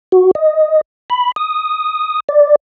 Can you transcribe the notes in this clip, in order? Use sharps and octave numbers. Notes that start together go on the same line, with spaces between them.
F#4
D#5
B5
D#6
D5